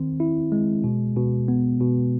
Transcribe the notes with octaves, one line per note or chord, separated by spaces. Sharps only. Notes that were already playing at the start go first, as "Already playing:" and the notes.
Already playing: D#3 C4
E4
G#3
B2
B2
B3
B2